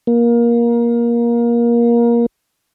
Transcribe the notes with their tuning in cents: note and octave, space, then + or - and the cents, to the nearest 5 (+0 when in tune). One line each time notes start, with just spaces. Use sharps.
A#3 +20